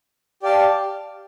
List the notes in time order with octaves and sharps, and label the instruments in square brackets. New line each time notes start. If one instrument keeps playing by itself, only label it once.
[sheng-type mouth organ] G4 D5 F5 A5